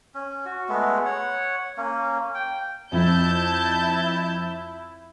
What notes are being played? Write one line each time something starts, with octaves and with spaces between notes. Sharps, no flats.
C#4
F#4
G#3 A3 B3
C#5 F#5
A#3 C#4
G5
F2 E4 A5 G6